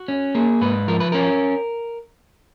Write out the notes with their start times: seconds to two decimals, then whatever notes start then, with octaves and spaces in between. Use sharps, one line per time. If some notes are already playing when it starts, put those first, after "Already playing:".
Already playing: F#4
0.08 C#4
0.35 A#3 G#4
0.61 G#2 B4
0.88 F3 A#4
1.00 B4
1.12 C#4 A#4